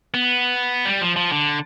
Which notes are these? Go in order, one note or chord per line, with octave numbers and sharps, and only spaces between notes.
B3
G3
F3
F3
D3